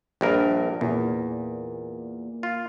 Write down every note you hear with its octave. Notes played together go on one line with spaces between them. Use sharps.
A#1 G2 A#4
E2 A#2
F4